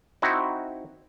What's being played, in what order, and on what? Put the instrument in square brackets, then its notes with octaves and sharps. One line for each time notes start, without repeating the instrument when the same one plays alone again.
[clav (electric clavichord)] C4 D#4 E4 F#4